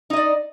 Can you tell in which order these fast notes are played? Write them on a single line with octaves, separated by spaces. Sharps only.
D#4 D#5 D5